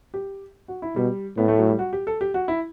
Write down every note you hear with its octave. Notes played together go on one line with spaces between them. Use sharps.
G4
F#4
E4
B2 G3
A2 B3
A3
F#3
G3
F#4
G4
A4
G4
F#4
E4